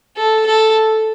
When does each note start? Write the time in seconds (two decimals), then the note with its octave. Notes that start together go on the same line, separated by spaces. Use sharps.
0.17 A4
0.46 A4